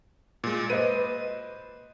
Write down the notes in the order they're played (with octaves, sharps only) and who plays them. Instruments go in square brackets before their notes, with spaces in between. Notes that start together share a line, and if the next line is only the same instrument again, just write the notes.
[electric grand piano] A#2 G#3
[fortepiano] B4 C5 D#5 [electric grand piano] D#7